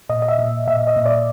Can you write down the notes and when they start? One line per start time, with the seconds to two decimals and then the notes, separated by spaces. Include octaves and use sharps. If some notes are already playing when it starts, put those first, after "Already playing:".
0.09 A#2 D#5
0.22 D#5
0.28 E5
0.39 A#2
0.67 A#2 E5
0.87 D#5
0.96 A#2
1.06 D5